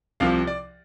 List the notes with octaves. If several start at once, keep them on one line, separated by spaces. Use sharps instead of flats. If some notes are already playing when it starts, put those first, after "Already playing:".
C2 C3 F3 F5
D5